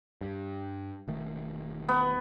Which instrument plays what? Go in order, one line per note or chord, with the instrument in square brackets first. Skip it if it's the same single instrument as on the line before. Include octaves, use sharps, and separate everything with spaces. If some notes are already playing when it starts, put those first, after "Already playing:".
[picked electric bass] G2
E1 D#3 A3
[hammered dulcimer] B3